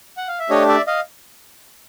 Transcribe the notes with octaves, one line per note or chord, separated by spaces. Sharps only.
F#5
F5
E5
A3 D4 G4 C#5 D#5
D5 E5
D#5 F5